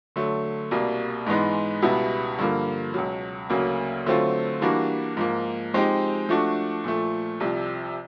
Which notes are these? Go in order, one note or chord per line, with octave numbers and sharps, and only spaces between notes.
D3 F#3 A3
C2 B2 G3 A#3
G#2 E3 G#3 B3 D#4
C#2 B2 G3 B3 E4
G2 D3 F3 A#3
C#2 B2 F#3
D2 C#3 F#3 A#3
D3 F#3 A3 C4 F4
E3 G3 A#3 D4 F#4
G#2 F3 A#3
F3 G#3 C4 D#4 G4
F3 A3 D4 F#4
A#2 F3 A3
C2 C3 F3